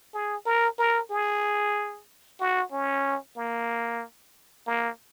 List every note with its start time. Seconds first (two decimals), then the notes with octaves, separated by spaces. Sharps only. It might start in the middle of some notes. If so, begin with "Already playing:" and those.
0.14 G#4
0.46 A#4
0.78 A#4
1.11 G#4
2.40 F#4
2.72 C#4
3.36 A#3
4.67 A#3